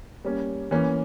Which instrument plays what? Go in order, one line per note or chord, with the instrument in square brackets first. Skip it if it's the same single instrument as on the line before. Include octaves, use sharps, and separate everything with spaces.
[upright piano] G3 A#3 C#4
E3 A#3 C#4